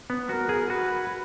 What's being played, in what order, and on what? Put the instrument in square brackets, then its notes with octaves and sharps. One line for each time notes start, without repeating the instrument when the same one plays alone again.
[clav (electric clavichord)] B3
[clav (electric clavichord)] F#4 [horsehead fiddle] A#4
[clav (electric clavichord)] G#4
[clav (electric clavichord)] F#4 [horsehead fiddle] B4